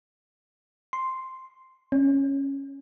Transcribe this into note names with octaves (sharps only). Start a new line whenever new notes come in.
C6
C#4